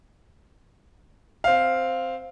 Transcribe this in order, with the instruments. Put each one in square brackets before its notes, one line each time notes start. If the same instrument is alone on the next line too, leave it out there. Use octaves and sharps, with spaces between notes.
[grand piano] C4 F5